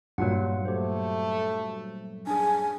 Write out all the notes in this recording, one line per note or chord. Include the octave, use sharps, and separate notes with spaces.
G2 A#2 F#3 A#3 F4 F#5
A3 G4 C5
D4 G#4 G#5